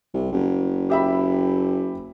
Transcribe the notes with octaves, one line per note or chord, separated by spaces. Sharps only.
C2
F#1
G4 E5 B5